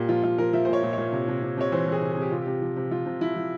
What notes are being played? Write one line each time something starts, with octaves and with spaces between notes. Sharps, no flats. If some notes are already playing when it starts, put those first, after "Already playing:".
Already playing: A#2 G4
F3 F4
A#2 F4
F3 A#4
F3 E5
C5
A#2 C#5
A#2
C#5
A#2
C3
C3
C3
C3 C#5
E3 C5
E3 G#4
C3
G#4
C3 G4
C3 F4
G4
C3
F3
C3
F3 F4
C3
F3 E4
F3